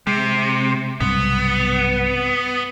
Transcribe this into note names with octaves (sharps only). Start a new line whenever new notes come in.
C3 G#3
B1 G2 C3 B3